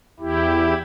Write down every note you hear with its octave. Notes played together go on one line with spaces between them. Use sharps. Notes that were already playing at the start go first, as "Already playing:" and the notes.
E2 E4 G4